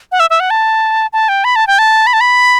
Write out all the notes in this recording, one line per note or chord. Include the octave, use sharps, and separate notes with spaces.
F#5
E5
E5
F#5
A5
A5
G5
B5
A5
G5
A5
B5
A5
B5